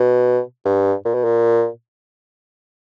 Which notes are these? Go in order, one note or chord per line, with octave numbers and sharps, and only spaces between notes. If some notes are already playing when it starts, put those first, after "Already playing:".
Already playing: B2
G2
A#2
B2
A#2